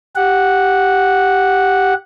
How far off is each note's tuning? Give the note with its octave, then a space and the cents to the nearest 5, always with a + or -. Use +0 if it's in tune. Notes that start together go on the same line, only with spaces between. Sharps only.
G4 +0 F#5 -5